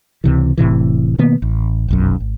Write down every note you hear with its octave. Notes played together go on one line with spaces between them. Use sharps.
C#2 C3 E3
F1 A2 C3 E3
B2 D#3 A#3 B3
A1
F1 B1 F#2
G#1